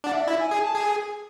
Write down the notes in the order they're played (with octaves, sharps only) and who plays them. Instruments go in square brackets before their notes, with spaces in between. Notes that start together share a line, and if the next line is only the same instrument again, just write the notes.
[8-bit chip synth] D4 [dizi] F#5
[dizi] E5
D5
[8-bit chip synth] E4 [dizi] E5
[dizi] G#5
[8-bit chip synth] G#4
[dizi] A5
[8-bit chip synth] G#4 [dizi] G#5